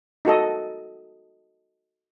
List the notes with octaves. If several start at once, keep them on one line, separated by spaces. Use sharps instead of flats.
D#4 F#4 A4 D#5